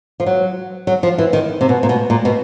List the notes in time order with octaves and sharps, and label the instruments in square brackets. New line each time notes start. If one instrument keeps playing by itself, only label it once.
[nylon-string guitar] F3
F#3
F#3
F3
E3
D#3
C3
B2
A#2
B2
A#2
B2